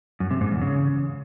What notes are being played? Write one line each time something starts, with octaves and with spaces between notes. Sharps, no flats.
F#2
C3
G#2
E2
C#3